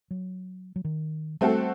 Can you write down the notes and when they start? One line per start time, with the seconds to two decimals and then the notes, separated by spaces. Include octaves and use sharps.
0.11 F#3
0.76 F#3
0.85 D#3
1.41 G3 A3 C4 F#4 A4